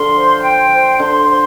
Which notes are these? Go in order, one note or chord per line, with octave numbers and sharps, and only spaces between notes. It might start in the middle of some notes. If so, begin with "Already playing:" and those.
Already playing: D3 F3 F4 C6
C5
G5
C5
D3 C6
C5